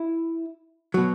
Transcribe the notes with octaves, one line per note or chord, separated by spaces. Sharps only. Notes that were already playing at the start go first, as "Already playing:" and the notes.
Already playing: E4
B2 F#3